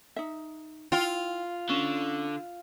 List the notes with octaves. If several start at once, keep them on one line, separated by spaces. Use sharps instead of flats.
D#4 E5
E4 F4 G5
D3 C#4